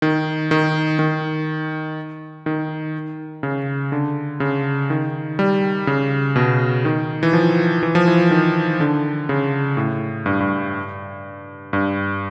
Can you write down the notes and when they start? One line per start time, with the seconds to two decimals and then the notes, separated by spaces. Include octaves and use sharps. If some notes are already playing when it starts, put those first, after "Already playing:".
0.02 D#3
0.51 D#3
0.99 D#3
2.46 D#3
3.43 C#3
3.92 D3
4.40 C#3
4.90 D#3
5.39 G3
5.87 C#3
6.36 B2
6.85 D#3
7.23 E3
7.33 F3
7.83 E3
7.95 F3
8.08 E3
8.31 D#3
8.80 D3
9.29 C#3
9.77 A2
10.26 G2
10.40 G2
11.73 G2